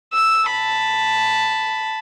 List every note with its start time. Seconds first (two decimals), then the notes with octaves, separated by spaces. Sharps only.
0.14 E6
0.50 A5 B5